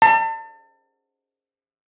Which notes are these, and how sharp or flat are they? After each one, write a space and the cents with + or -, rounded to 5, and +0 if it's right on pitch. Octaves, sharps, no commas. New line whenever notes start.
A5 +40